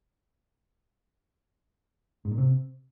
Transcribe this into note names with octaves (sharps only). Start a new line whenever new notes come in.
G#2
A#2
C3